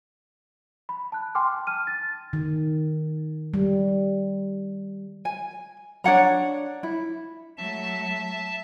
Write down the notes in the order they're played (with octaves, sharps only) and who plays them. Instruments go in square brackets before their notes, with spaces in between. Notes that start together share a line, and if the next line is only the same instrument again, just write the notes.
[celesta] B5
A5 F#6
G5 G#5 C6 D6 F6
A5 F6 D#7
A6
[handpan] D#3
G3
[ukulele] G#5
D4 C#5 F#5 A#5
E4
[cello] F#3 A3 [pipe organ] E5 A5